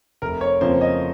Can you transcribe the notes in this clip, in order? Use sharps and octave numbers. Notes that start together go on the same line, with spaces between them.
F1 A#4
C#5
F2 C#3 F3 A#3 C5
D#5